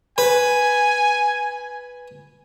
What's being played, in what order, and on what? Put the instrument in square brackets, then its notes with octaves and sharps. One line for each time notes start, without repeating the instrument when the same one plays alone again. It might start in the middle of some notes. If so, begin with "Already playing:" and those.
[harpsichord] B4 [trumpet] G#5